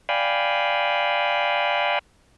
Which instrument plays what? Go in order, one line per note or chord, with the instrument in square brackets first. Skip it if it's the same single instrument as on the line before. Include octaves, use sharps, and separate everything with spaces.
[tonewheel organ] D5 F5 G5 G#5 B5